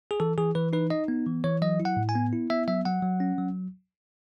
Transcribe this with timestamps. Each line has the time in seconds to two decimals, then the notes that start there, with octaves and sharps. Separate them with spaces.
0.11 G#4
0.20 E3 A4
0.38 E3 G#4
0.55 E3 B4
0.73 D#4 B4
0.90 D#4 D#5
1.08 B3
1.27 E3
1.44 E3 C#5
1.62 F#3 D#5
1.80 E4
1.85 F#5
1.97 A2
2.09 G#5
2.15 B3
2.33 E4
2.50 B3 E5
2.68 F#3 E5
2.85 F#3 F#5
3.02 F#3
3.20 C#4
3.38 F#3